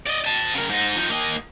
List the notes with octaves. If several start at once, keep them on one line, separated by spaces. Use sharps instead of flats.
D5 D#5
D#5 A5
C#3 A#4
G#2 D#4
F3 D#4
A#3 D#5